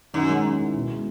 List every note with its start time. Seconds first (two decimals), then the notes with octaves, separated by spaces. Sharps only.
0.14 F#2 D#3
0.29 G#3
0.44 C#4
0.60 E4
0.74 B2
0.90 G#3